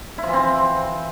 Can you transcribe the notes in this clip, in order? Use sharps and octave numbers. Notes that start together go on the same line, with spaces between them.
E4
F3
E3
C4